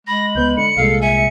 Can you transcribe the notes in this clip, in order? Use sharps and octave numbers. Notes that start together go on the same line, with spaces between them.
G#3 B5 A#6
C#2 B3 G6
D3 C#7
C2 A#2 G#3 A4 F5
E5 G#5 C#7